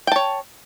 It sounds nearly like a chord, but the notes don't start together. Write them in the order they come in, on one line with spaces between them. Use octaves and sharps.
G5 A5 C#5